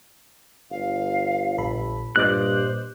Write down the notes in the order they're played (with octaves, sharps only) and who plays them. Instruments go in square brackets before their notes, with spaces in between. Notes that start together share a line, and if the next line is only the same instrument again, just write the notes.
[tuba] G1 [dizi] F5
[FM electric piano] A#1 A4 B5
[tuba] G2 [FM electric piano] A#2 D#5 D6 [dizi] C5 [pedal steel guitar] F#6